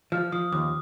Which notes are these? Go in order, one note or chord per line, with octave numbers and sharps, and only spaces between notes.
F3 F6
F3 D#6
D#2 D6